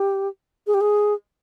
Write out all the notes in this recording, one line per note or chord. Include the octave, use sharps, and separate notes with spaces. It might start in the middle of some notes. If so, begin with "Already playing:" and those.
Already playing: G4
G#4
G4
G#4